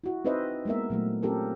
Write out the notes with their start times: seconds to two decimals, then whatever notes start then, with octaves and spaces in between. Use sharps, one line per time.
0.04 E4 F#4
0.25 C4 D#4 B4 C5 D#5 E5
0.65 G#3 A#3 B3 A#4 E5
0.90 A#2 F#3 A3
1.23 C4 C#4 F4 G4 A4 A#4